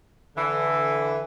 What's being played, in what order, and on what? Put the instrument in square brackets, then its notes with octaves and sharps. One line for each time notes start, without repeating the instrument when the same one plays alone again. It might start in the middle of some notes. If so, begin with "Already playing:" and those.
[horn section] D3 E3